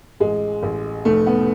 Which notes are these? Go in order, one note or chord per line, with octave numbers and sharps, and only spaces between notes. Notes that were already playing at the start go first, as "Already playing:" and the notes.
A1 G#3
A1
F1 A3
B3